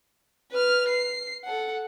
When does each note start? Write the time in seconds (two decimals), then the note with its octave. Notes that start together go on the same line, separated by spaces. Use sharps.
0.51 B4 F6
0.89 C7
1.45 A4 F#5